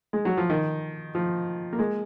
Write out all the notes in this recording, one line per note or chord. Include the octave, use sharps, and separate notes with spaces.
G#3
F#3
F3
D#3
F3
A#3
G#3